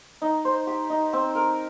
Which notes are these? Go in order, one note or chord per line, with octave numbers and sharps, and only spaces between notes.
D#4
C5
G4
D#4
C4
A#4